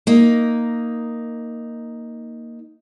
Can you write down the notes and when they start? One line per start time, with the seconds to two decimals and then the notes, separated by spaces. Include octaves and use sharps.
0.07 A#3 D#4